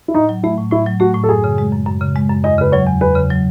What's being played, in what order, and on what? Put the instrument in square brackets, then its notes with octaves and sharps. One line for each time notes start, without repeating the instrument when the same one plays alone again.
[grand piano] E4
[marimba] A2 [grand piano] D#4
[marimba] F#3
[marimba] A3 [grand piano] E4
[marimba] A2
[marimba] A2 [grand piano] E4
[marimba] F#3
[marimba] A3 [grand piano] F#4
[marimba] A2
[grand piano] A4
[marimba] F#2 [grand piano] G#4
[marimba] C#3
G#3
F#2
F#2
C#3
G#3
F#2
[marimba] E2 [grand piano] D#5
[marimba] C#3 [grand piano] B4
[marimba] F#3 [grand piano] C#5
[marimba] E2
[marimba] E2 [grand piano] B4
[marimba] C#3
F#3